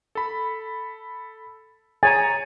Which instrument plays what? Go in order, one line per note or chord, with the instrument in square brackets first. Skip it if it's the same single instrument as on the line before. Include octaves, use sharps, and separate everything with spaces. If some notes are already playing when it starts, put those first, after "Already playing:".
[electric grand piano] A4 B5
[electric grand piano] G#4 C#5 A#5 [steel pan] G#5 [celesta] A6